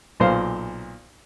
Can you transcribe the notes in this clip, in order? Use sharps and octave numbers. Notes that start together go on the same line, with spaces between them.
B1 A#2 C5 F5